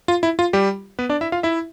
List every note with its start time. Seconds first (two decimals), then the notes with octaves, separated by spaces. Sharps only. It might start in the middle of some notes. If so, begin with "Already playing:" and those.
0.08 F4
0.23 E4
0.39 F4
0.53 G3 G4
0.99 B3 B4
1.09 D4 D5
1.21 E4 E5
1.32 F4 F5
1.43 E4 E5